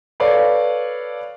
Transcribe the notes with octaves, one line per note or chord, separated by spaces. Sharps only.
A4 B4 C#5 D5 F5